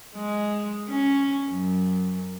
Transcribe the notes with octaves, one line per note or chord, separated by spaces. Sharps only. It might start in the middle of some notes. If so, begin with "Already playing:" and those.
G#3
C#4
F#2